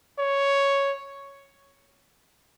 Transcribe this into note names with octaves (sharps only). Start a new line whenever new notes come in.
C#5